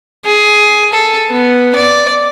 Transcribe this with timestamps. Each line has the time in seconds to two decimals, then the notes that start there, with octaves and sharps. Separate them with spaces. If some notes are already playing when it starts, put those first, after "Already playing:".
0.25 G#4
0.93 A4
1.30 B3
1.75 D5